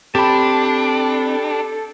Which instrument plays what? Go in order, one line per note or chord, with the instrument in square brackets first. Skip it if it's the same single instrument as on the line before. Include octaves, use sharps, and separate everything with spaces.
[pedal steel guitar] C4 A5 [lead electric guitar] D4 [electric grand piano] G4 B5 [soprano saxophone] A4